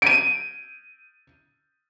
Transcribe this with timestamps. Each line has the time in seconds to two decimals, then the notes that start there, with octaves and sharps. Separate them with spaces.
0.02 D7 D#7